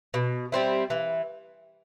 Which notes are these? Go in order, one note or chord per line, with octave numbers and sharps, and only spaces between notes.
B2
G3 C4 E4
E3